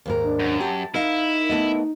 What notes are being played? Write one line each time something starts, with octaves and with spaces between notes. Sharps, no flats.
D#2 G#2 A#4
D4
F#2
G4 A5
D#4 E4 A#4 D#5 F5
A3 B3 D#5